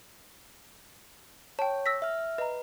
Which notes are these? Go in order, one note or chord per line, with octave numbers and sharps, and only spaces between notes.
C#5 G5 A5
E6 A#6 B6
E5 F6
B4 D#5 A#5